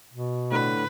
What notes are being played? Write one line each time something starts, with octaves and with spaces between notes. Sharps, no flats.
B2
A2 D3 B4